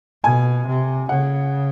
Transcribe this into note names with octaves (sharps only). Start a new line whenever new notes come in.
B2 G#5
C3
C#3 F#5